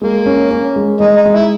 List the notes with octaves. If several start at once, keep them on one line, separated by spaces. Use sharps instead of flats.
G#3 A#3
C#4
C#4
G#3
G#3 D#4
D#4
G#3
E4